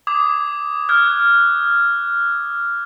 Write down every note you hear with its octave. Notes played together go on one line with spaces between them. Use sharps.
D6 D#6 G#6
F6 F#6 G#6